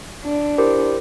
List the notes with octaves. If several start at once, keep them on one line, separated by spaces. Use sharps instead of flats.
D4
E4 G4 A#4 C5